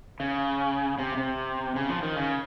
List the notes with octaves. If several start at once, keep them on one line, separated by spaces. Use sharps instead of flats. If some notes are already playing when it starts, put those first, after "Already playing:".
C#3
C3
C3
C#3
F3
D#3
C#3